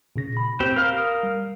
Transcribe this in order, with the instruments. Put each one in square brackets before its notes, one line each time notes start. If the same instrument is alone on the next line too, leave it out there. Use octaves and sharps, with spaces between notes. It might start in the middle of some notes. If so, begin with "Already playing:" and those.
[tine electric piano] A#2 C#3 A#6
B5
[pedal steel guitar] C4 G4
A#4 F5 F6
[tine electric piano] D#6
G3